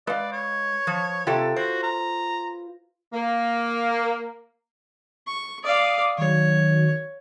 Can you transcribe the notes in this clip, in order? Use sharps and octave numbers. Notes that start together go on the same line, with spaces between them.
G#3 B4 D5 F5
C#5
F3
C3 F4 G4 A4
F#4 C5
A#5
A#3
C#6
D5 F5 D6 D#6
D#3 F#3 C#5